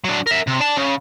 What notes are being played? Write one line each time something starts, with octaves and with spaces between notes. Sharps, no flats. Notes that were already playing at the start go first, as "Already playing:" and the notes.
F#3 D4
A#4 E5
C3
D5 A5
C#3